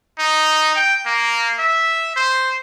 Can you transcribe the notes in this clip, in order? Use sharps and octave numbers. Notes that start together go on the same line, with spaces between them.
D#4
G5
A#3
E5
C5